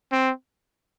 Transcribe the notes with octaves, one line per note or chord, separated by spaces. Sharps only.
C4